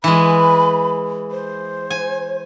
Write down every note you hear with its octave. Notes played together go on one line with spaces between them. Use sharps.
E3 G#3 B5
C5
G#5